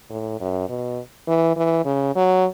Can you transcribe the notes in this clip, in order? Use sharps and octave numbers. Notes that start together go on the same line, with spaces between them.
A2
F#2
B2
E3
E3
C#3
F#3